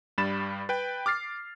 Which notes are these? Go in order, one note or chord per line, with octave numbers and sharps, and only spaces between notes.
G2 G3 B5 A6 E7
B4 G5
D6 F6 A6 C7